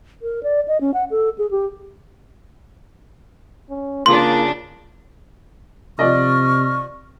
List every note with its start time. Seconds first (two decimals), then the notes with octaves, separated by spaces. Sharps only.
0.22 A#4
0.43 D5
0.68 D#5
0.81 C#4
0.94 F#5
1.11 A4
1.38 G#4
1.51 G4
3.70 C#4
4.06 C#3 A#3 D4 F4 G#4 C6
5.99 C3 F3 D5 D#5 C#6 F6